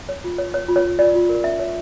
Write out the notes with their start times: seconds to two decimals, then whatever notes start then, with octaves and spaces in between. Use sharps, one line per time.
0.09 C#5
0.24 F4
0.38 C#5
0.54 C#5
0.68 F4
0.76 C#5
0.84 F4
0.99 F4 D5
1.14 F4
1.29 A#4
1.44 C#4 E5
1.59 C#5